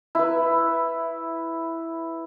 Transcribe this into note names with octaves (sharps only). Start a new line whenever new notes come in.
E4 B4